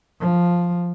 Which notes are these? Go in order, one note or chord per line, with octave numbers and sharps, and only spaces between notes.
F3